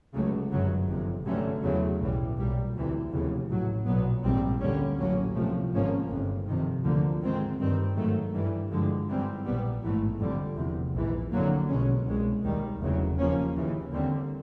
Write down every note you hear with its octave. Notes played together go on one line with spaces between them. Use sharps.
C#2 C#3 F#3 A3
G1 F#2 C#3 F#3
G1 F2 C3
G2 D3 F#3 A3 C#4
E2 C#3 F#3 A3
B1 A2 E3 G3
B1 A#2 G3
D2 C3 E3
F1 D#2 C#3 E3
A1 A2 F#3
B1 A#2 F#3 B3
A#1 G#2 D#3 G3 C4
D2 D3 G3 A#3 C#4
A1 A2 F#3 A#3 C#4
C2 C3 F3 A3
G#1 G#2 F3 A#3 C#4
G1 F2 C3
F2 C3 D#3
D2 D3 F3 A#3
G#2 D#3 G#3 C4
G2 D#3 G3 C4
G#2 D#3 F#3 A3
G2 E3 G3
G2 D3 F3 G#3
G#2 E3 G3 C4
A#1 A#2 G3 B3
A1 G#2 E3 A3
F2 D3 G3
F1 E2 C3
A#1 G#2 E3
F2 D3 F#3 A#3
B1 B2 G#3 C#4
C2 B2 G#3
D#2 D#3 G3
F1 E2 C#3 F#3
D#2 C#3 F3 A#3 C#4
D#2 C#3 E3
D#2 D3 G3 C4